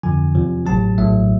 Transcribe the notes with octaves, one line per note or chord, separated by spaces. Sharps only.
F2 D3 F3 G#5
E2 C3 F3
A1 A2 F#3 A5
A#1 A2 F#3 E5